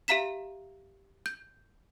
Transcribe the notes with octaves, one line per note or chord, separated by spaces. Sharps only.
G4 E5 F5 A#5 B6 E7
G6